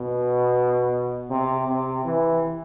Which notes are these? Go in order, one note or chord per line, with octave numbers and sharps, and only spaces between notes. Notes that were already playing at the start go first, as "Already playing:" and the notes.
Already playing: B2
C3
C3
E3